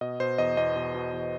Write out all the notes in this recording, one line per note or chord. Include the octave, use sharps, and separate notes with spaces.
B2 D#5
B2 C5
E2 D#5
E2 D#5
B2
B2
E2